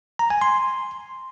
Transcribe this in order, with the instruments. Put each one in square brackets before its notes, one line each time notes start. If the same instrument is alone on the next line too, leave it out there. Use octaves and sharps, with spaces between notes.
[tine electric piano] A#5
G#5
C6